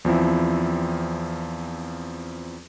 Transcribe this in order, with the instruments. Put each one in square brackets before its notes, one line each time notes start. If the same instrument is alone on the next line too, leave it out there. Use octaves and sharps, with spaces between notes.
[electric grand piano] E2 F3 C4 E4